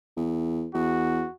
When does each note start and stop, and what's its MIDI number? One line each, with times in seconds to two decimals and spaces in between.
0.17 0.68 40
0.74 1.24 40
0.74 1.33 66